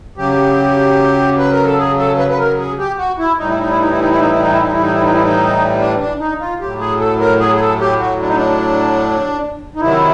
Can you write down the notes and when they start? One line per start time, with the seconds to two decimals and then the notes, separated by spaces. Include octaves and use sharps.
0.17 C#3 F#3 G4
1.38 B4
1.52 A#4
1.64 A4
1.78 G#4
1.98 A4
2.18 B4
2.30 B4
2.38 A#4
2.58 G#4
2.78 G4
2.98 F#4
3.18 E4
3.39 A2 E3 G3 D#4
3.49 E4
3.59 D#4
3.69 E4
3.79 D#4
3.90 E4
4.00 D#4
4.10 E4
4.20 D#4
4.31 E4
4.41 D#4
4.51 E4
4.62 D#4
4.72 E4
4.82 D#4
4.93 E4
5.03 D#4
5.13 E4
5.23 D#4
5.79 D4
5.99 D4
6.20 D#4
6.40 F4
6.60 A2 F#3 G4
6.80 G#4
7.00 A4
7.20 A#4
7.40 G#4
7.56 G#4
7.60 A4
7.80 G4
8.00 F#4
8.20 D4
8.28 D#4
8.36 D4
9.75 D#4
9.81 C3 D#3 F#3 E4